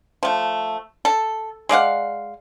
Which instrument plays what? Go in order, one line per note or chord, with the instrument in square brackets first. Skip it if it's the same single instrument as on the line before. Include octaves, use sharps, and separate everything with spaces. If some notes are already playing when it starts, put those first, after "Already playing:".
[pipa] F3 A3
A4
G#3 D5 F5 F#5